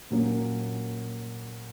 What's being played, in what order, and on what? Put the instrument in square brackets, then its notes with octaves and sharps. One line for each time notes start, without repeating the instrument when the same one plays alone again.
[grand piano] A#2 F#3 A#3 C#4